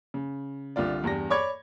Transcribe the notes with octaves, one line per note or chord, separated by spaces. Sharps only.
C#3
C2 D3 F4 D5
E2 G2 G4 A#6
C#5 D5 B5 C#6 D6 G#6